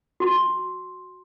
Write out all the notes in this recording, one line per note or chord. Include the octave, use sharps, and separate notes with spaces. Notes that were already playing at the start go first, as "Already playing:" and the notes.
F#4 C6